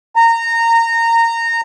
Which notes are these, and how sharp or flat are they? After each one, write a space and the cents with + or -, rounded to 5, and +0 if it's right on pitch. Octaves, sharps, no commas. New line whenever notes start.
A#5 -20